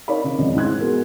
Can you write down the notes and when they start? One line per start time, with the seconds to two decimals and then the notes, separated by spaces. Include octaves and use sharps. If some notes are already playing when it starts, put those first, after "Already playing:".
0.08 D#4 A#4 C#5 D5 F5 B5
0.24 C#3
0.38 E1 C#3 F3 D#5
0.55 G#2 E4 C6 F#6 G#6
0.80 B3 F#4 G#4 A#4